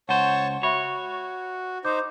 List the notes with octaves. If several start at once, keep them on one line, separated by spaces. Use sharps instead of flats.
C#2 C5 C#5 F#5 A5 C#6
F#4 C#5 E5 B5
D#4 C5 D6 G6